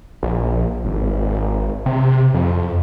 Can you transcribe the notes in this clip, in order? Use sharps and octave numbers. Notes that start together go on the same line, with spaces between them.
A#1
G#1
C3
F2